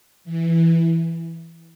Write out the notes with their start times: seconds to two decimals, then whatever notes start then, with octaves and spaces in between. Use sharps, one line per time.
0.25 E3